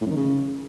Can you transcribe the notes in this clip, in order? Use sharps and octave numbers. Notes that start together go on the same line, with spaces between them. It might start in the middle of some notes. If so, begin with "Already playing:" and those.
A2
F#2
D#3
C#3